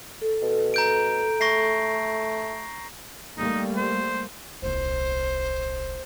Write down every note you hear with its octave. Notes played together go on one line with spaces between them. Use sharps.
A4
B2
A#5 G6 D7
A3 C#6 A#6 C7
G3 A3 A#3 D#4
C5
D#1 C2 C5